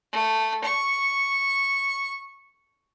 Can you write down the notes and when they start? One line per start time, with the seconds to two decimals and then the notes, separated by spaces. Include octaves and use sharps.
0.12 A3
0.64 C#6